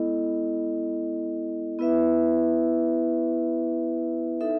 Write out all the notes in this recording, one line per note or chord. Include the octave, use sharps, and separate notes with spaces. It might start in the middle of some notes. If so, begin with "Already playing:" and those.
Already playing: G#3 B3 E4 A4 D#5
B3 E4 B4 E5
D#4 A4 E5